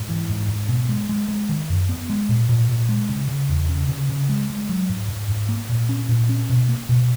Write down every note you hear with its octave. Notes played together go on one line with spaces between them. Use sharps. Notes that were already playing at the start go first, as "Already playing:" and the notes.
Already playing: G#2
E3
G#2
G#2
B2
G#3
G#3
G#3
D#3
F#2
B3
G#3
A#2
A#2
A#2
G#3
C#3
C#3
E2
C#3
C#3
C#3
G#3
G#3
F#3
G#2
G#2
G#2
A#3
A#2
C#4
A#2
C#4
B2
A#3
B2